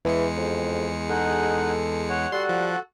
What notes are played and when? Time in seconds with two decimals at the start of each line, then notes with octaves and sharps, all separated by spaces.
0.05 E2 E3 G#3 C#7
0.37 F2
1.09 D#4 G#4 A4 F#5
2.09 C#5 F#5
2.32 G3 F#4 A4 F#5 C6
2.49 F3